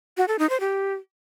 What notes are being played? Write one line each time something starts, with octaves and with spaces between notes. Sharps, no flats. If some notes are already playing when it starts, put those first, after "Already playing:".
F#4
A4
D#4
C5
G4